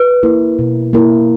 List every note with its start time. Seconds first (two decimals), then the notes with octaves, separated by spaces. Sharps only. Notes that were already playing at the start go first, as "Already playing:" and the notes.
Already playing: B4
0.23 A#3 E4 A#4
0.59 B2
0.93 A#3 E4 A#4